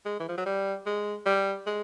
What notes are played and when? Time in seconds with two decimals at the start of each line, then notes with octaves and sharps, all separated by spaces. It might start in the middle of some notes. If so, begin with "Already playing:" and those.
0.06 G#3
0.20 E3
0.28 F3
0.38 F#3
0.46 G3
0.86 G#3
1.26 G3
1.67 G#3